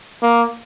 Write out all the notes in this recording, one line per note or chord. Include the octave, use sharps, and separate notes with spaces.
A#3